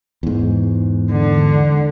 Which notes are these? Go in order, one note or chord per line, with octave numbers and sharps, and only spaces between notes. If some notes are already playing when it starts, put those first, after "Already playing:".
E2 G#2
D3